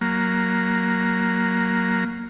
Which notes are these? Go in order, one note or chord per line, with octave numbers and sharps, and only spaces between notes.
F#3 A#3